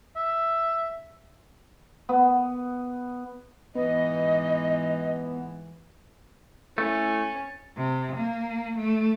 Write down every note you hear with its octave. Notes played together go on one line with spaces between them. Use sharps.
E5
B3
G#2 E3 B3 D#5
A3 C#4 E4 A6
C3
A#3
A3